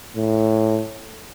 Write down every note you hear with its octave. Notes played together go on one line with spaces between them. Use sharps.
A2